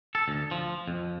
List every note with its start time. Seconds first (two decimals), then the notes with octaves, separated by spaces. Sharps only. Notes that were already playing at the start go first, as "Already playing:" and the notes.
0.15 A4
0.28 D2
0.51 F3
0.88 F2